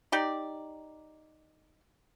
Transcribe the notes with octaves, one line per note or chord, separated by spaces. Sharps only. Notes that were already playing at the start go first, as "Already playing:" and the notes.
D#4 G4 D5